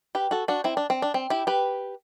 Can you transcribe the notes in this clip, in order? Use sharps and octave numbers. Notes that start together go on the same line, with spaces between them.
G4 B4
F#4 A4
D4 F#4
C4 E4
D4
C4
D4
C4
E4 G4
G4 B4